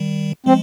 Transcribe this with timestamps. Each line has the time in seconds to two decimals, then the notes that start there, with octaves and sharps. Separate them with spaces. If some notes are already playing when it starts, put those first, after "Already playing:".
Already playing: D#3 G3
0.46 F3 G#3 C4